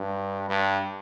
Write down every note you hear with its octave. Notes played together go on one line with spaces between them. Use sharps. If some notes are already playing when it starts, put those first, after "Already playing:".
Already playing: G2
G2